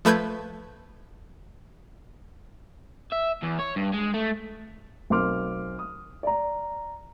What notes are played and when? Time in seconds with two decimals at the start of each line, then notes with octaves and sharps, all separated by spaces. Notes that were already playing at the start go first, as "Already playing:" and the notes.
0.05 F3 A3 B4 G6 G#6
3.12 E5
3.42 E2
3.59 C#5
3.76 G2
3.94 G#3
4.14 A3
5.10 B1 C4 A#4 C6 D6 F6
5.79 D#6
6.23 D5 A#5